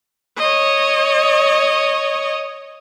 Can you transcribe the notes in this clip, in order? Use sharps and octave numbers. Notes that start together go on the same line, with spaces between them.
C#5 D#5